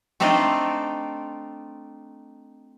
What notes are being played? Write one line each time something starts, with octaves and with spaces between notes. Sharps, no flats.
A3 C4 D4 D#4 F4